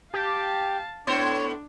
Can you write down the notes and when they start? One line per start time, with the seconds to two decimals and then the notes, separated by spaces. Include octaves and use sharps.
0.14 G4 F5 A5
1.07 A2 B3 D4 C5 C#5